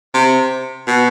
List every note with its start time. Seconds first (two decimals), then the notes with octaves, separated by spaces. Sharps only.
0.14 C3
0.87 B2